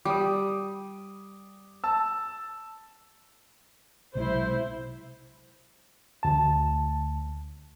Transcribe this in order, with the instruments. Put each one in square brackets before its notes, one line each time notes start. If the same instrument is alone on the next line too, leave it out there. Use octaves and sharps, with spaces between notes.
[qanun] G3 [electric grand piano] D6 D#6
[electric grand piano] A5 E6
[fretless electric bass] B1 C3 G#3 [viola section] E4 C5
[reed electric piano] D2 A5